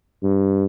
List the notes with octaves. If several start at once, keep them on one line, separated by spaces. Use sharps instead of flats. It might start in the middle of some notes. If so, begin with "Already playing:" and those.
G2